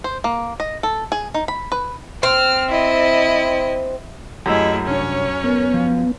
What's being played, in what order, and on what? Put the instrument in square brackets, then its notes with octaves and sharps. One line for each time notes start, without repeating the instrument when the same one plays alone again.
[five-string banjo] C5
A#3
D#5
A4
G#4
D#4
B5
B4
[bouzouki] C4 [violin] F6
[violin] E4 D#5
[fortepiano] F#2 E6 [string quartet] A3 E4 G#4 [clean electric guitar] G4 D#5
[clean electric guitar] C2 D4 [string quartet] C#4 C#5
[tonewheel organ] B3 [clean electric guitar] A#4
[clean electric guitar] F3